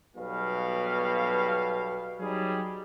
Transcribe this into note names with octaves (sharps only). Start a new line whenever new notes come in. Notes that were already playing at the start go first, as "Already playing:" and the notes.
B1 B2 G3 B4 F5
F#3 G3 D#4 G#4